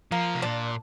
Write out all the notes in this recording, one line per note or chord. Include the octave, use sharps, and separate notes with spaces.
F3 A#3
C3
A#2 D4